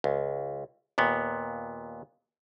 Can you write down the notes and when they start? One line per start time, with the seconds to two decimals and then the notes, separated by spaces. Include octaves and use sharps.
0.04 C#2
0.98 D#2 A#2 B3